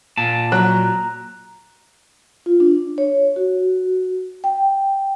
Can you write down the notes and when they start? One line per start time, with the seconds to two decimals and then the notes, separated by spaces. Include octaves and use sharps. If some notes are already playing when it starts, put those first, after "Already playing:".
0.17 A#2 A5
0.52 F#3 A#5 F#6
2.46 F4
2.60 D4
2.98 C#5
3.36 F#4
4.44 G5